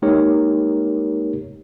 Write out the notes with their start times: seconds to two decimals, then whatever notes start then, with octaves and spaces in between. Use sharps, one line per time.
0.02 G#3 A#3 D#4 G4 A#4 C#5